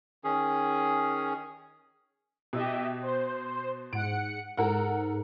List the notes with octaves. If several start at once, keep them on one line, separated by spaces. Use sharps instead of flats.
D#3 C#4 G#4
B2 G4 D#5 E5
C5
G#2 F#5 C#7 D7
G#2 A4 A#4 F#5